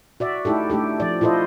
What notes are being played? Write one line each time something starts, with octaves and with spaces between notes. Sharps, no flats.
F#4 D5 E5
A3 D#4 E4 G4 A4
A3 D4 G4 A4
F3 D5
E4 F4 A4 C5 D#5